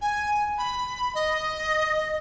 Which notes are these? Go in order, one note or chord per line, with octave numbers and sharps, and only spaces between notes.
G#5
B5
D#5